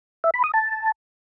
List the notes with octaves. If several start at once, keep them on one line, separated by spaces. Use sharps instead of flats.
E5
B5
D#6
A5